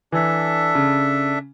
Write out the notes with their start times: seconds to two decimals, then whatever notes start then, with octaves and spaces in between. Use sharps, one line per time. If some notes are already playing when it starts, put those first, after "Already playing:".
0.12 E3 D4 A4 E5
0.75 C#3